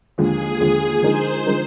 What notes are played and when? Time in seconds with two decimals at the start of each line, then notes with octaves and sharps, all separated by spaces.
0.18 D#2 D3 F3 G#3 G#4
0.60 D#2 D3 F3 G#3
1.03 D3 F3 G#3 D#4 A#4 C5
1.46 D3 F3 G#3 D#4 A#4